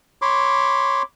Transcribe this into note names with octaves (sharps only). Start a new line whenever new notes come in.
C#5 B5 C6 D6